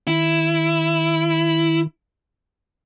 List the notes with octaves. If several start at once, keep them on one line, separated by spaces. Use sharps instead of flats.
D#3 E4